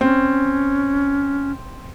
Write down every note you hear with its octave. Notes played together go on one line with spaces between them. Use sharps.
C4 C#4